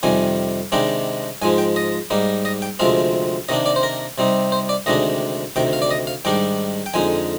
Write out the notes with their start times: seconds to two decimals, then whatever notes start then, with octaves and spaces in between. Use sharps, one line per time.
0.03 F2 C3 D#3 G3 G#5
0.72 C3 D#3 G#3 D4 G5
1.42 G#2 F3 G#3 G#5
1.58 G5
1.76 D#5
2.10 G#2 G3 A#3 D#4
2.45 D#5
2.62 G5
2.79 D2 C3 F3 G#3 C4 F5
3.49 C3 D#3 A#3 D4 D#5
3.66 D5
3.76 C5
3.83 A#4
4.18 C3 G3 C4 D#4
4.52 C5
4.69 D5
4.86 D2 C3 D#3 G#3 D4 D#5
5.56 D2 C3 D#3 G5
5.73 F5
5.82 D5
5.91 D#5
6.07 F5
6.25 G#2 D#3 G3 D4 G5
6.86 G5
6.94 F2 D3 G#3 D#4 G#5